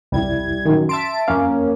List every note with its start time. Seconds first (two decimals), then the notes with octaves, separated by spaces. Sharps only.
0.12 C2 F2 G3 E4 G#6
0.66 F#2 A#2 D#3
0.89 E5 A5 C6 D7
1.28 F2 A#3 C#4 F5